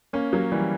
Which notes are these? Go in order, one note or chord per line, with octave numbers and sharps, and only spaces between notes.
A#3 C#4
F#3 A#3
E3 G3